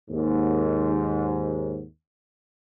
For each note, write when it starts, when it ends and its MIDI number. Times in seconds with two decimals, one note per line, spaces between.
0.10 1.83 39
0.10 1.83 44